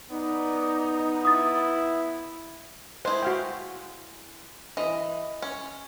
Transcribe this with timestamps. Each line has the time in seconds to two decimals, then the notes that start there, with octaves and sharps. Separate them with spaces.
0.10 B3 D#4 D5
1.25 E4 D#6 A6
3.05 G#3 E4 C5
3.22 F#4 F5 G5
4.77 E3 D#5
5.42 C#4